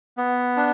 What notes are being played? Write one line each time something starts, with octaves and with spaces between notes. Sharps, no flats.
B3
D4